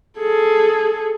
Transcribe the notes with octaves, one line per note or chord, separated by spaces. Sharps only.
G#4 A4